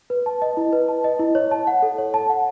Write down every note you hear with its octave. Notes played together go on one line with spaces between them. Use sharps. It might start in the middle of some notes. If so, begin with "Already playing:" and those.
B4
A5
D#5
E4
B4
A5
D#5
E4
C#5
A5
F#5
A4
C#5
A5
F#5